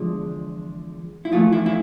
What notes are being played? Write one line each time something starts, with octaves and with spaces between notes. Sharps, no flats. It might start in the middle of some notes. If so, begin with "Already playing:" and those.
Already playing: E2 D3 F3 G#3
E4
F2 E3 A3 F4
E4
E4